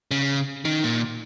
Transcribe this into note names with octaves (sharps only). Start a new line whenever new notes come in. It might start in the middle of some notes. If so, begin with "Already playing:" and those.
C#3
D#3
A#2